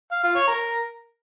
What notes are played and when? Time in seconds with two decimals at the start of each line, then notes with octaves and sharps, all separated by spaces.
0.12 F5
0.24 F4
0.36 C#5
0.47 A#4